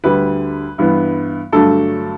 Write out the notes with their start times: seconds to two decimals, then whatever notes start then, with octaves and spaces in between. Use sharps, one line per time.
0.04 D2 D3 G3 B4
0.78 G2 E3 B3
1.52 G2 D3 F#3 A3 D4 A4